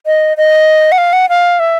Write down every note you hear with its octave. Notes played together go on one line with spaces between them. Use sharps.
D#5
D#5
F#5
F5
F#5
F5
E5